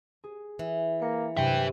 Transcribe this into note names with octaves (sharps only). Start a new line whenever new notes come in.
G#4
E3
A#3 A#6 C#7
G2 C3 F#3 B4 E5 G5